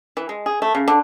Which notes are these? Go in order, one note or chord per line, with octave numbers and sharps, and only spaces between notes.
E3
G#3
G#4
A3
C#3
D3